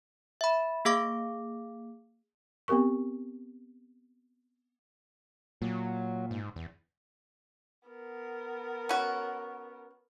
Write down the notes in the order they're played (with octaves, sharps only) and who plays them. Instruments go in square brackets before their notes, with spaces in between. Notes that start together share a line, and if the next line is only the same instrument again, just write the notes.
[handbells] E5 B5
A#3 G#4 F5 D6
[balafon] B3 C4 G4 A#4 C#6
[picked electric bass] A#2 [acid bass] F#3
[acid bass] G#2
E2
[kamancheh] B3 A#4
[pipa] C#4 F#4